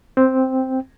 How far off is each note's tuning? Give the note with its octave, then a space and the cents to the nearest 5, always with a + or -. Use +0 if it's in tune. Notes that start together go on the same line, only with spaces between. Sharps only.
C4 +0 G5 +0